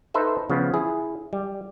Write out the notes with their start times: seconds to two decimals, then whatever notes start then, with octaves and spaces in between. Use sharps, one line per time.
0.14 D#4 A4 B4 C5 E5
0.50 C#3 F3 B3
0.74 E4 G#4
1.33 G3